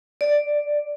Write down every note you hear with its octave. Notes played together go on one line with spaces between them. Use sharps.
D5